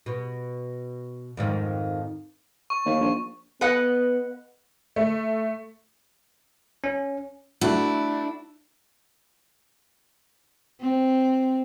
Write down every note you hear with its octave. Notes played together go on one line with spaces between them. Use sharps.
B2
F2 G#2 D#3
C#6
D#2
A#1
B3 B4 D#5 F#5
A3
C#4
A3 D4 E4 F#4
C4